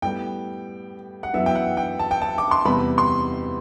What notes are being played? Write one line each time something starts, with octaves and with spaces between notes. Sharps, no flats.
A2 G3 B3 G5
F#5
F#2 E3 B3 E5
G5
F#5
G5
A5
G5
A5
D6
C6
E2 C3 G3 B3 B5
C6